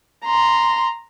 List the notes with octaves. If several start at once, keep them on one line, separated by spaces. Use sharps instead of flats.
A#5 C6